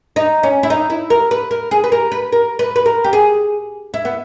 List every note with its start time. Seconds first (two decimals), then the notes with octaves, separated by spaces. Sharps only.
0.16 D#4
0.43 C#4
0.63 E4
0.70 D#4
0.90 E4
1.10 A#4
1.31 B4
1.51 A#4
1.71 G#4
1.84 B4
1.92 A#4
2.12 B4
2.32 A#4
2.59 B4
2.76 B4
2.86 A#4
3.04 G4
3.13 G#4
3.94 E4
4.05 B3